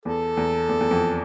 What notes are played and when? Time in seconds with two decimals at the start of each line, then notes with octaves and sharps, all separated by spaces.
0.05 E2 A4
0.37 E2
0.69 E2
0.81 E2
0.91 F2